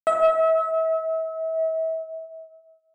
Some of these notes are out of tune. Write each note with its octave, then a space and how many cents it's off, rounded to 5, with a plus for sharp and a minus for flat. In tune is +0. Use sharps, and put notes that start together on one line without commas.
E5 -35